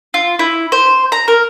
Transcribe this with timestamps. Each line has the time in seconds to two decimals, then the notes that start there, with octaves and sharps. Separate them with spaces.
0.14 F4
0.39 E4
0.72 C5
1.12 A#5
1.28 A#4